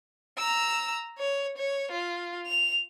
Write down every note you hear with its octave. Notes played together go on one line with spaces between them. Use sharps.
A#5 E6
C#5
C#5
F4
F7